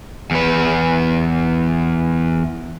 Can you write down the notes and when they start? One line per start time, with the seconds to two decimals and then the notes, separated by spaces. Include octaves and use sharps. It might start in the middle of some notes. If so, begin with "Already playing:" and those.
0.31 E2 B4